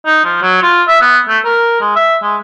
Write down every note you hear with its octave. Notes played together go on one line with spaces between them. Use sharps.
D#4
F3
F#3
F4
E5
B3
A3
A#4
G#3
E5
G#3